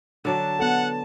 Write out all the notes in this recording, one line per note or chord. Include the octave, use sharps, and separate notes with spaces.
D3 F#3 D4 A5
B3 A4 F#5